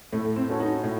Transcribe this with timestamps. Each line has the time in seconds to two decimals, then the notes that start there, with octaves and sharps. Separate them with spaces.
0.12 A2 A3
0.36 C4
0.48 A3 C#4 F#4 A4
0.60 D#4
0.83 A2